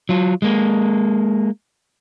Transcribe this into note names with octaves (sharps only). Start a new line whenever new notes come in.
F#3 F4
G#3 A#3